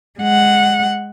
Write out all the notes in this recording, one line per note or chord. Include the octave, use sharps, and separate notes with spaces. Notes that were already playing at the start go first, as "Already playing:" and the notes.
G#3 F#5